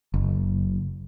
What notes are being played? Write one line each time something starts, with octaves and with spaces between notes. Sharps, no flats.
F#1